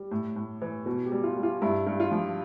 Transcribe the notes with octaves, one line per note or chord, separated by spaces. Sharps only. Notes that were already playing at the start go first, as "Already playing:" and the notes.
Already playing: G3
A2
A2
E3
B2
G4
G3
F4
G3
F4
G2 E4
G2
F4
F3